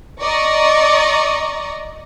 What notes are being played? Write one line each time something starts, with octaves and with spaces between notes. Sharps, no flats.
D5 D#5 A#5 C#6